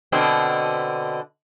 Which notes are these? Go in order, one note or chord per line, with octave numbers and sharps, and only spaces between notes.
B2 D3 C4